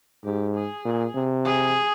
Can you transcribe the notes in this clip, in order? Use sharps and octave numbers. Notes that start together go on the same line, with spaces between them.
G#2 G4
G#4
A#2
C3
G#4